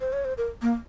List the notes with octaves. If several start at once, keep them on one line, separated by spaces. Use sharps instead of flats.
C5
C#5
C5
A#4
A#3